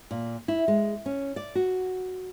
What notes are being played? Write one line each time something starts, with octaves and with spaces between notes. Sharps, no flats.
A#2
E4
G#3
C#4
D5
F#4